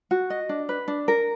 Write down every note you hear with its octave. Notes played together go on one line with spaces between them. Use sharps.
F#4
D#5
D4
B4
D4
A#4